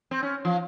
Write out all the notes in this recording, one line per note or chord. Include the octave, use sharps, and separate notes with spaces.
C4
C#4
F3